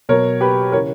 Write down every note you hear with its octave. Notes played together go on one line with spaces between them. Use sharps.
B2 F#3 A#4 C#5
G4 B4
C#3 E3 A#4 C#5